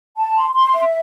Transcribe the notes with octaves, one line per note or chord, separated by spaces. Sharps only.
A5
C6
C6
E5